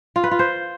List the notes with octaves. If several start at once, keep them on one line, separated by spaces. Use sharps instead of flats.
F4
B4
F4
C5